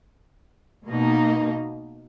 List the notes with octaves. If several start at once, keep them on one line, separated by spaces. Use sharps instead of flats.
B2 A#3 D#4